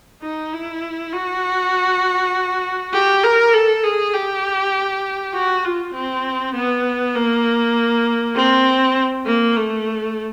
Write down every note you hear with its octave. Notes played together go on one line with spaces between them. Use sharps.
D#4
E4
F#4
G4
A#4
A4
G#4
G4
F#4
F4
C4
B3
A#3
C4
A#3
A3